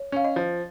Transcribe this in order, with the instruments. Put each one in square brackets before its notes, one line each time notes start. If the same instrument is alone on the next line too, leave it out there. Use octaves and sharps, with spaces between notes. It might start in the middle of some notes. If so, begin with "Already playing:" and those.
Already playing: [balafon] C#5
[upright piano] C#4 [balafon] F5
[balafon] D#5
[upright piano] F3